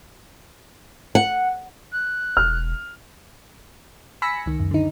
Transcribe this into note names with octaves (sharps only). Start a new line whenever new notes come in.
F#5
F#6
E1 F6
G#5 B5 E6 A#6 B6 C#7
C#2 D#3
F#2
D3 D#4